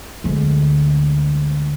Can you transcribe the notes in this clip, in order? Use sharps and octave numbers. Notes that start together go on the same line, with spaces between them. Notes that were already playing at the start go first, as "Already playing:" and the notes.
D2 G#3